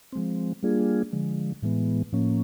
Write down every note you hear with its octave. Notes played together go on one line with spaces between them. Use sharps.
F3 G#3 C4
G3 A#3 D4 F4 G#4
D3 F3 G#3
A2 E3 G#3 B3
A2 F3 A#3 C#4